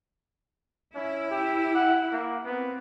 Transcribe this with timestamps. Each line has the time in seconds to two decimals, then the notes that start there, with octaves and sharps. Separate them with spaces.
0.95 C#4 E4
1.31 G4
1.75 F#5
2.12 A#3
2.45 B3 C4